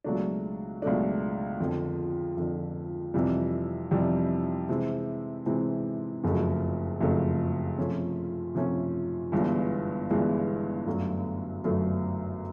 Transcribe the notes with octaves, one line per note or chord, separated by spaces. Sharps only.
C#2 B2 F#3 A3 D4
C#2 B2 F#3 A3 D4
F2 D3 F3
F2 D3 F3
F2 C3 E3 G3
F2 C3 E3 G3
C3 E3 G#3 C4 E4
C3 E3 G#3 C4 E4
F#1 F2 C#3 F#3 A3
F#1 F2 C#3 F#3 A3
C3 F3 A3 C#4 F4
C3 F3 A3 C#4 F4
G1 G2 E3 G#3 B3
G1 G2 E3 G#3 B3
G1 F#2 D3 F#3 A3
G1 F#2 D3 F#3 A3